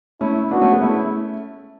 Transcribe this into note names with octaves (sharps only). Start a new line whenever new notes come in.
A3 C#4 E4
B3 D4 F#4
A3 C#4
G#3 B3
A3 C#4 E4